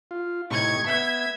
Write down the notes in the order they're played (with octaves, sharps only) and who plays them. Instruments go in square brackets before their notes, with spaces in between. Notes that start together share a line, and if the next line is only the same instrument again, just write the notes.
[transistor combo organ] F4
[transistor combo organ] A2 C3 D#4 [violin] C#6 G#6
[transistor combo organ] B3 [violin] E5 G#6